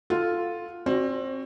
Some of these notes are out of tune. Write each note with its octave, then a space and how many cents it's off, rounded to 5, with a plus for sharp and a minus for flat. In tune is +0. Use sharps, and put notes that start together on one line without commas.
F4 +0 A4 +0 F#5 +0
C4 +25 F#4 +5 D5 +0